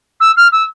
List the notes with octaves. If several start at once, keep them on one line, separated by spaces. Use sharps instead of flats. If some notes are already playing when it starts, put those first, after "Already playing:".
E6
F6
E6